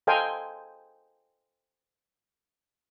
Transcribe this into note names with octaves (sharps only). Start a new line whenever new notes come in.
A4 C5 D#5 F5 G5 G#5